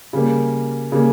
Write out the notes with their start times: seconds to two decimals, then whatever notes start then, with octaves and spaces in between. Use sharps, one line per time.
0.13 C#3 G3 A#3
0.92 C#3 G3 A#3